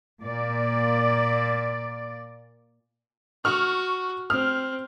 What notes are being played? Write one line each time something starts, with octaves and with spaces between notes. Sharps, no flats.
A#2 D5
F#4 C#6 F6
C4 F6